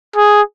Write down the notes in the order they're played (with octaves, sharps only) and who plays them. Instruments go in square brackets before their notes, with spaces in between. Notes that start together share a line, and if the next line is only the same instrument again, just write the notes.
[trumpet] G#4